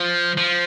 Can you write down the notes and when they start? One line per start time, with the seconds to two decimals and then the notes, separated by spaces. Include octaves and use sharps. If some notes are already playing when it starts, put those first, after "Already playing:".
Already playing: F3
0.38 F3